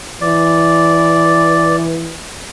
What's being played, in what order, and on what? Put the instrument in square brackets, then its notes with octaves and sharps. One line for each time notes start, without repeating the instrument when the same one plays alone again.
[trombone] E3 [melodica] D5